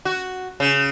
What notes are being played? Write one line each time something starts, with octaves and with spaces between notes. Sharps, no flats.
F#4
C#3